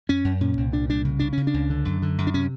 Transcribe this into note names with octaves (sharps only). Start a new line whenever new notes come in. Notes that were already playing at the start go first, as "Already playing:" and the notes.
F#2 C#4
F#2
A#2 C#4
C2
A#2 D4
C2 D4
C#3
C#3 D4
C#3 C#4
D4
C#2
D3
F#2
D3
F#2
D4
C3 C#4